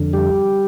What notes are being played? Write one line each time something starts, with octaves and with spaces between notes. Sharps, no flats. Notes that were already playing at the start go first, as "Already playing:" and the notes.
Already playing: F2 D3
G3 G4